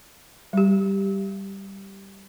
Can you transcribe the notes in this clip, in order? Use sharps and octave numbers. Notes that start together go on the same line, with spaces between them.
G3 G4